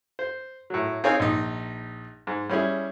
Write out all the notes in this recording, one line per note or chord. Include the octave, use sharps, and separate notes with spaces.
C5
A2 F#3
C4 D#4 G#4 C#5 F5 G#5
A#1 D#4
G#2
G3 C#4 E4 G#4